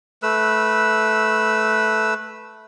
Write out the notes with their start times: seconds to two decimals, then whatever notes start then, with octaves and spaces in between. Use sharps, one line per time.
0.23 A3 B4 E6